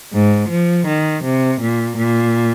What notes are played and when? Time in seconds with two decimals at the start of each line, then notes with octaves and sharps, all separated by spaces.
0.14 G#2
0.50 F3
0.87 D#3
1.24 C3
1.61 A#2
1.97 A#2